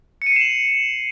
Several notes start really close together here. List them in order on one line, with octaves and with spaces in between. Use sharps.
C#7 D#7 C7 E7 F#7